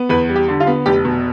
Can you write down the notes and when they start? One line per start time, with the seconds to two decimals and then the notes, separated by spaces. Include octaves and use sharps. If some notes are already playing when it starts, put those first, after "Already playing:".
Already playing: B3
0.09 E2 B4
0.29 G3
0.36 G4
0.48 D3
0.60 F4
0.67 B3
0.86 F1 G4
1.05 B2